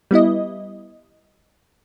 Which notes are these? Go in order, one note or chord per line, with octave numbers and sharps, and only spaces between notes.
G3 B3 E4 D#5